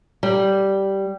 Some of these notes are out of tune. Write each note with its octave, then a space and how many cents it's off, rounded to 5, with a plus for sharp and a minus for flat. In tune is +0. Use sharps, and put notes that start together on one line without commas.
G3 -10